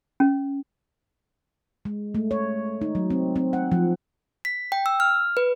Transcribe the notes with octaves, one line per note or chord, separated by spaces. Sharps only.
C#4
G#3
A3
C#5
D#4
F#3
C4
C4
F#5
F3
B6
G5
E6
F6
B4